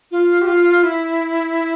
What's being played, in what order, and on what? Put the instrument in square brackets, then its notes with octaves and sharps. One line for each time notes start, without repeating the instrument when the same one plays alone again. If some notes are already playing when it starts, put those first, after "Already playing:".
[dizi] F4
G4
F4
E4